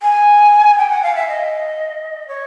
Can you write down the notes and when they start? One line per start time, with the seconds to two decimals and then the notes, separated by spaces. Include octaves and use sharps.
0.02 G#5
0.77 G5
0.89 F#5
1.02 F5
1.15 E5
1.27 D#5
2.27 C#5